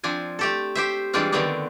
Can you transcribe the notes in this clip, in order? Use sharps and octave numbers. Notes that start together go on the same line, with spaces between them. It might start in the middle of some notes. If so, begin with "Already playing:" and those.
F3 C4 D4 G#5
A3 G4 A4
G4 C5 E5
E3 G3 G#3 C4 D4 F4
D3 D#3 A3 B3 C4 D4